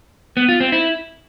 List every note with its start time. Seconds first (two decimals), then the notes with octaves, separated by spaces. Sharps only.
0.37 B3
0.49 F4
0.60 C4
0.72 E4